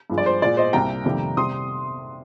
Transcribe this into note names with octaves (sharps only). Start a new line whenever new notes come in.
G2 F3 G#3
D5
C5
A#2 G#3 D5
C5 D#5
C2 C3 G3 A#3 G5 A#5
F2 C3 D#3 G3 A#3
C3 G3 C6 D#6